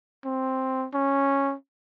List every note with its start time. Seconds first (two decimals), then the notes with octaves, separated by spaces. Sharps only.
0.25 C4
0.94 C#4